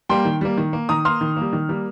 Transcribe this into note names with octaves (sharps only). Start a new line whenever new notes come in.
G3 A#3 G5 C6
D#3
G3 A#3
D#3
A#3
D#3 A#5 D#6
A#3 C6 F6
D#3
G3 A#3
D#3
G3 A#3